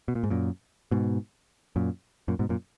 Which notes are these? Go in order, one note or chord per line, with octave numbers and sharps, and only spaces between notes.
B2
A#2
G#2
F#2 A#2
G#2 B2
F#2 A#2
F#2 A#2
G#2 B2
F#2 A#2